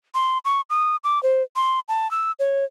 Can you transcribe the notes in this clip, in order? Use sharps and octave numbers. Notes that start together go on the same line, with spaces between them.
C6
C#6
D#6
D6
C5
C6
A5
E6
C#5